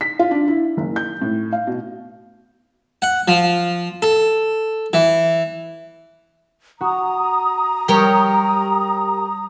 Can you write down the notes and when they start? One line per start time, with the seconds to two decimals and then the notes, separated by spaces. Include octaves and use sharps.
0.01 B6
0.19 F4
0.31 D4
0.48 E4
0.77 F#1
0.96 G6
1.21 A2
1.53 F5
1.67 B2
3.02 F#5
3.28 F3
4.02 A4
4.93 E3
6.81 F#4 A#5 D#6
7.88 G3 G4 A#4 C#5